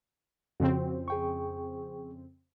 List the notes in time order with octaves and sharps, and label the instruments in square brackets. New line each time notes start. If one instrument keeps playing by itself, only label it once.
[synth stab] F2 C#3 C4 [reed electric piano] F#4
[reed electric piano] G#4 G5 C#6